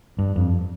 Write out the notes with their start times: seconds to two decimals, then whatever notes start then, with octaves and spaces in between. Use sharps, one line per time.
0.19 G2
0.36 F2